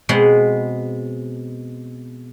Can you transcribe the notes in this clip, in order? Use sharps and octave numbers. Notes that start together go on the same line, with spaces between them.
B2 G#3 B3 C4